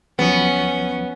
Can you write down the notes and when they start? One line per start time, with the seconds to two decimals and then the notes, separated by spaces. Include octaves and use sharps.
0.19 D2 F3 F#3 B3 C#4